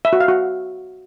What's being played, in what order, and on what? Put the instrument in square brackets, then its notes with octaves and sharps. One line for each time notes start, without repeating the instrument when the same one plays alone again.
[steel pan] E5
F#4
F5
F#4